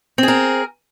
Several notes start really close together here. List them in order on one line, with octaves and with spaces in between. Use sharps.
C4 G#4 A#4